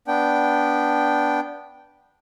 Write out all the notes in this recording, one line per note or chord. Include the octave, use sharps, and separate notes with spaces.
B3 D4 G5